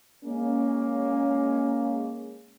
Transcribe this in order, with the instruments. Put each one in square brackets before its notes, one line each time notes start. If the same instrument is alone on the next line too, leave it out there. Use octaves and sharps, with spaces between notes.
[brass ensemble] G#3 A#3 C#4